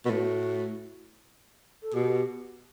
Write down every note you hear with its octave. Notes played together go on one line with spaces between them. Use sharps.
B2
A2 F#4
A4
B2 G4